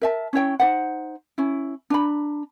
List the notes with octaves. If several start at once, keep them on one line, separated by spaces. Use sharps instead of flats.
A#4 E5 A5
C#4 E4 C#5 G5
D#4 C5 F#5
C#4 E4
D4 A#5 B5